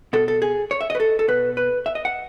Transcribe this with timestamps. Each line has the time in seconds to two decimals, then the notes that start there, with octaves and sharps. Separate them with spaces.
0.13 B2 A4
0.28 A4
0.42 G#4
0.71 C#5
0.81 E5
0.90 D#5
0.95 B4
1.00 A4
1.19 A4
1.28 B2 B4
1.57 B4
1.86 E5
1.95 D#5
2.05 F#5